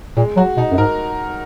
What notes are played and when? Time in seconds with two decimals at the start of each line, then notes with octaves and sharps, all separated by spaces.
0.17 A#2 G#3
0.36 F#3 F#4
0.57 B2 D#4
0.72 F#2
0.78 G#2 A#4